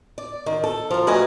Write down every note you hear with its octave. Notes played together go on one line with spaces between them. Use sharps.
D5
D#3
A4
F3 A#4
F#2 G3 A3 B4 D#5 G#5